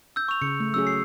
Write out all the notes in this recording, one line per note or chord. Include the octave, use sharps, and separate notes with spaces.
E6 G6
C#6 F7
C#3 C#7
A3
F#3 C#4 G#4 E6
C7